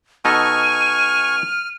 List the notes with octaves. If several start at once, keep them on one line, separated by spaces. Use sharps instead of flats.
B2 D#4 A4 G#5 C#6 F6 D#7